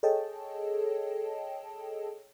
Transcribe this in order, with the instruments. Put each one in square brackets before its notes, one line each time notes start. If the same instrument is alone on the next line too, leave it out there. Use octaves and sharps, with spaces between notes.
[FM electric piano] G#4 A4 C#5 D#5 G5 A5